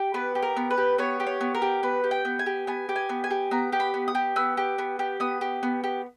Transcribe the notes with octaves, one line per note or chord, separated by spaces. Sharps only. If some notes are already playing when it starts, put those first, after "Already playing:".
Already playing: G4
B3 B4
G4
A#4
B3
B4
G4
B3 C#5
G4
C#5
B3
A#4
G4
B3 B4
G4
G5
B3
G#5
G4
B3 G#5
G4
G#5
B3
G#5
G4
B3 A#5
G4
B5
B3
D#6
G4
B3 E6
G4
B3
G4
B3 D#6
G4
B3
G4